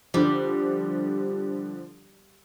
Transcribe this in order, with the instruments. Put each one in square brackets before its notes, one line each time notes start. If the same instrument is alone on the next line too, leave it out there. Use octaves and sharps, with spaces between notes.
[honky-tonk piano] D3 F3 [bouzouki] G3